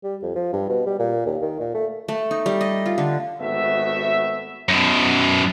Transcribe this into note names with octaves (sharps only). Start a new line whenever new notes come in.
G3
F2
F3
G2
B2
G3
A#2
D#2
D#3
A#2
A3
A3
D#4
G3
D#5
F4
D3
G#1 A3 B3 F#4 E5
F#2 B2